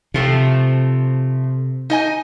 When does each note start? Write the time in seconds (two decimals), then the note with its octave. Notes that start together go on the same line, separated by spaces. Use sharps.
0.14 C3 F3 A3 C4
1.90 D#4 D#5 G#5